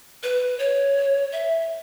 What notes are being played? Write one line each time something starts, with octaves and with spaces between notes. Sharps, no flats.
B4
C#5
E5